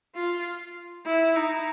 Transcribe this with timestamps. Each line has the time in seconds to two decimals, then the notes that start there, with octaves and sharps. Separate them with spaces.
0.15 F4
1.06 E4
1.36 D#4